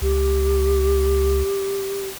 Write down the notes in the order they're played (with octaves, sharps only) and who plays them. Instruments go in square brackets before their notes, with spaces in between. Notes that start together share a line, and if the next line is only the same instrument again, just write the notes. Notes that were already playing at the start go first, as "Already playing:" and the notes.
[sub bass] C#2 [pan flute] G4